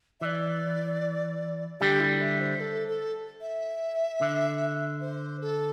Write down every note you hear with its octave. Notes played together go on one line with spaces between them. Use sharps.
E3 D5 E5
D3 G3 G4
E4
E5
C5
A4
A4
E5
D3
C5
A4